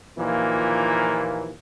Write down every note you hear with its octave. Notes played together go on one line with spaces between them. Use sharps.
D#2 A#2 E3 F3 A#3